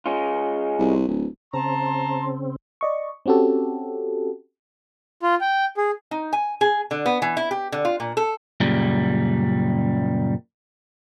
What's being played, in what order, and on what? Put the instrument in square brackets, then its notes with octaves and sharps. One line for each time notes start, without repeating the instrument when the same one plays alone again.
[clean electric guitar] G#3 C#4 F4
[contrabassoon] C2
D1
[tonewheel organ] C#3 C4 [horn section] A5 A#5 C6
[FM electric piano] D5 D#5 C#6
C4 C#4 F#4 G4 A4
[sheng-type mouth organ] F4
G5
G#4
[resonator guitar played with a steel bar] D#4
G#5
G#4
D3
B3
E3
E4
G4
D3
F4
A#2
A4
[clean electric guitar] F#2 A#2 C#3 G3